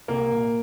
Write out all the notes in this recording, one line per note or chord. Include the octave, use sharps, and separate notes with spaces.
C2 A#3
A#2